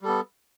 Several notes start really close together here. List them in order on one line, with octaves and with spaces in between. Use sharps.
G3 A4 B3